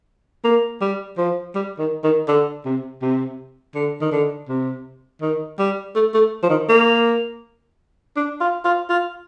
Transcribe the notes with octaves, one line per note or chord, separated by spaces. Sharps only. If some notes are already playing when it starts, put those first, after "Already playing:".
A#3
G3
F3
G3
D#3
D#3
D3
C3
C3
D3
D#3
D3
C3
D#3
G3
A3
A3
F3
D#3
A#3
D4
F4
F4
F4